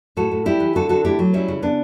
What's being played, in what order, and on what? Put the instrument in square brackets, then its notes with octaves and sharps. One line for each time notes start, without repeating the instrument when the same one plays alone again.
[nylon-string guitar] A2 F#4 A4
A2
G3 E4 G4
E3
D3 F#4 A4
D3 F#4 A4
A3 E4 G4
F#3
G3 C#4 E4
C#3
C#3 B3 D4